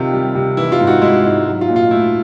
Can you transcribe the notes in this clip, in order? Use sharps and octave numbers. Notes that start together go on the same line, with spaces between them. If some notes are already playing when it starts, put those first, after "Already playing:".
Already playing: C3 D#3 F4
G3
C3
E3 E4
F4
G#2
F#4
G#3 E4
G#2
F#3
F4
A#2
F4
A3 E4